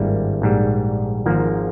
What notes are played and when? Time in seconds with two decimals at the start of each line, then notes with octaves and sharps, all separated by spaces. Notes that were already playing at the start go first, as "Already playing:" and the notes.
Already playing: G#1 G2 G3 A#3 E4
0.42 A#1 G#2 G3
1.26 G#1 G#2 F3 A#3